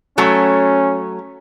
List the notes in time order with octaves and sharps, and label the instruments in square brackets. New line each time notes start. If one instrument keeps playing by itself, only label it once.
[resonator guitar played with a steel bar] F#3 A3 [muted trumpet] C#4